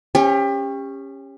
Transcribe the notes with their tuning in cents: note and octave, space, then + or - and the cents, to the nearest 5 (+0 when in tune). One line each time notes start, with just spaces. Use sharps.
C#4 -10 G4 +30